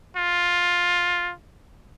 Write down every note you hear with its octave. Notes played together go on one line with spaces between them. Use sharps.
F4